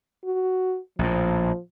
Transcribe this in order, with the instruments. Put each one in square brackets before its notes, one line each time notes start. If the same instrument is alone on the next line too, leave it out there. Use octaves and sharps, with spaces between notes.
[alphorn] F#4
[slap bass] A#1 A2 [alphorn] F3